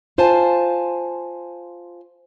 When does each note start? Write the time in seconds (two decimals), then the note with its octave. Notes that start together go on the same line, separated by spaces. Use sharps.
0.18 F4 C5 F5 G#5 A5